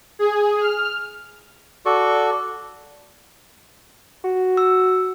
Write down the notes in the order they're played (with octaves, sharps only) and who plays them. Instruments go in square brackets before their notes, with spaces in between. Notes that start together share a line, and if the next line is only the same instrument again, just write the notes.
[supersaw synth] G#4
F6
[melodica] F#4 A4 D5 C#6
[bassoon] F#4
[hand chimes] E6